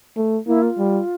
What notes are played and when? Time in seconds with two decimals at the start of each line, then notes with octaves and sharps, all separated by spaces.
0.17 A3
0.47 A#3 E4
0.62 F4
0.78 G3